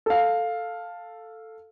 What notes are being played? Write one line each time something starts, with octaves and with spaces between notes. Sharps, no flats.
A4 F5